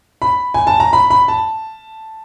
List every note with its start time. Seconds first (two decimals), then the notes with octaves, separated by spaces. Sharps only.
0.22 B5
0.54 G#5
0.67 A5
0.80 A#5
0.93 B5
1.10 B5
1.28 A5